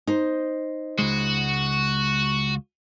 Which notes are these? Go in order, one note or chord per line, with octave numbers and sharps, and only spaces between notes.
D#4 C5
C#2 G#3 F#4